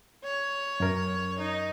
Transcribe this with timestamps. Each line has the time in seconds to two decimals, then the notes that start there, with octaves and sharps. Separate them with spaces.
0.24 C#5
0.80 F#2 A#4
1.39 D#4